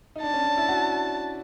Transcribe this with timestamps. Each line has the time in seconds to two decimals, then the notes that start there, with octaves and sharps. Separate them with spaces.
0.16 D#4
0.22 D4 A5
0.34 C#4
0.45 D4
0.57 E4
0.68 F#4